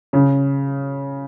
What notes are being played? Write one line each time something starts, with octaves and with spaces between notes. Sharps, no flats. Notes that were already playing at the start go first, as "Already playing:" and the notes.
C#3